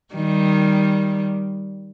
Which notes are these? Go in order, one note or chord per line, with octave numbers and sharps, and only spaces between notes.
D#3 G3